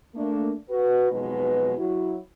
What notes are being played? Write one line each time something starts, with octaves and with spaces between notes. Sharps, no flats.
A3 A#3 D4
F#4 B4
F2 B2 F#3 G#3 D#4 B4
F#3 E4 F#4